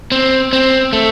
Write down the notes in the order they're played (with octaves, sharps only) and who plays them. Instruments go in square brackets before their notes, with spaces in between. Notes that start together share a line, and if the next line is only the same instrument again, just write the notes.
[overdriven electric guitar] C4
C4
A3